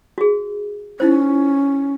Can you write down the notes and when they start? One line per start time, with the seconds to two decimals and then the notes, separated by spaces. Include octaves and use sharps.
0.18 F#4 G#4
1.00 C#4 D#4 E4 C5